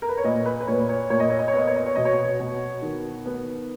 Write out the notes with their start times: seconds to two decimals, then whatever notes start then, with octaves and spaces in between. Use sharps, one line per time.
0.02 A#4
0.09 B4
0.18 C#5
0.24 A#2 D#5
0.46 B4
0.61 B4
0.67 A#2 C#5
0.89 C#5
1.10 A#2 C#5
1.20 D#5
1.30 C#5
1.39 D#5
1.48 C#5
1.54 B3 D#5
1.67 C#5
1.76 D#5
1.86 C#5
1.96 B2 D#5
2.05 C#5
2.40 B2
2.82 D#3
3.26 B3